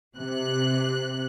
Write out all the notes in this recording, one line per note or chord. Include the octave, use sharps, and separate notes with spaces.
C3 F#6